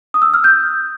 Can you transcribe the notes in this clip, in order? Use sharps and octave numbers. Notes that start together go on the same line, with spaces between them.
D#6
E6
F6
G6